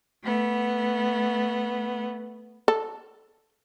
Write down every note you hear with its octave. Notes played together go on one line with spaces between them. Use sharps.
A3 B3
A4